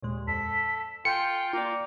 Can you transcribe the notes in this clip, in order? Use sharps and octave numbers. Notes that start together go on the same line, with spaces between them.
D#2 A#2 G#3
F2 A4 B6
F4 A4 G5 G#5 C#7
A#3 F4 D5